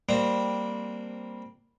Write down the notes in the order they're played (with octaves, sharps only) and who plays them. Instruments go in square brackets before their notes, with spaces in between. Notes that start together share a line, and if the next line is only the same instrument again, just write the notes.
[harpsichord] G3 A#3 C4 D4